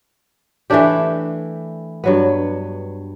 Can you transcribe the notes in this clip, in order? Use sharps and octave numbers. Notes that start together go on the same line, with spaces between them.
E3 A3 D4 G4
G2 F#3 B3